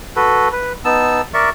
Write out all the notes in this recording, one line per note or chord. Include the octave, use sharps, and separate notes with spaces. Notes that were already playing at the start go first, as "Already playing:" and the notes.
F#4 A4 B4
B4
B3 D#4 A5 E6
A#4 D5 E5 C#6